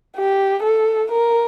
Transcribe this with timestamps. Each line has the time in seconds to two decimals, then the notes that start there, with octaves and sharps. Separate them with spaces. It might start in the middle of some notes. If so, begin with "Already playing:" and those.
0.17 G4
0.63 A4
1.11 A#4